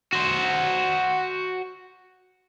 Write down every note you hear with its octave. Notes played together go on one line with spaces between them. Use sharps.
F#4 C5